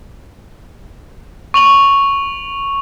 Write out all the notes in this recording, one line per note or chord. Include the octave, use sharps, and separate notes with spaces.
C#6 F7 F#7